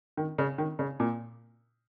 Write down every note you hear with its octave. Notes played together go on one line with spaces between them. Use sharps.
D#3
C#3
D#3
C#3
A#2